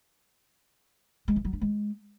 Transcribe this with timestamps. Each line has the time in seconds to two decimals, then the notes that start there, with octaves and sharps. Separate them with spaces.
1.28 G#3
1.36 E3
1.45 F#3
1.53 D4
1.61 G#3